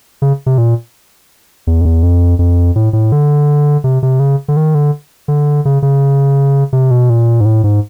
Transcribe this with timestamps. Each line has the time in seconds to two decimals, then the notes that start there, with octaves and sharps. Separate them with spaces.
0.22 C#3
0.46 C3
0.58 A#2
1.67 E2
1.81 F2
1.85 E2
2.03 F2
2.39 F2
2.76 A2
2.93 A2
3.12 D3
3.84 C3
4.03 C3
4.20 C#3
4.48 D3
4.57 D#3
4.75 D3
5.28 D3
5.65 C#3
5.82 C#3
6.73 C3
6.91 B2
7.10 A#2
7.41 G#2
7.45 A2
7.64 G#2